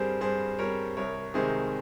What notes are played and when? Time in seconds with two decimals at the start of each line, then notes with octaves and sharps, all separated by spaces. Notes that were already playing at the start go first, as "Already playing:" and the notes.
Already playing: G2 G3 C4 G#4 A#4 C5
0.21 G2 G#4 C5
0.59 G3 C4 A#4 C#5
0.97 C2 A#4 C#5
1.34 C3 D#3 G#3 G#4 C5